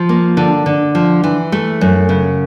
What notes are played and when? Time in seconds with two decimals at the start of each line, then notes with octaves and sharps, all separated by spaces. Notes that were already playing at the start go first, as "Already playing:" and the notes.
Already playing: F3
0.09 A#3
0.37 D3
0.66 D3
0.95 F3
1.24 E3
1.52 A3
1.81 F#2
2.09 C#3